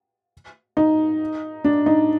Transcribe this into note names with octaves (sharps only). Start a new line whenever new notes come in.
D#4
D4
D#4